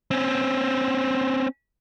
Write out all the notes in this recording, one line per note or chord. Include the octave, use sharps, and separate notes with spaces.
C4 C#4